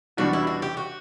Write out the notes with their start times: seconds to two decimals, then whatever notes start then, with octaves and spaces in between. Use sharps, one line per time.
0.17 E2 B2 G3 D4 F#4
0.33 E4
0.47 F#4
0.62 G4
0.77 F#4